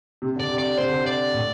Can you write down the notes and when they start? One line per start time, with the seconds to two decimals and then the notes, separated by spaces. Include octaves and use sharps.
0.22 C3
0.36 D3
0.40 D5
0.49 C3
0.58 D5
0.78 C3 C5
0.88 D3
1.00 C3
1.06 D5
1.34 A2